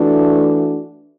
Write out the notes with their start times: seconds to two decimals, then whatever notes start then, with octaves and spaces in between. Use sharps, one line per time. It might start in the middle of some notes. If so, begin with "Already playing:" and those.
Already playing: E3 A3 D4 F#4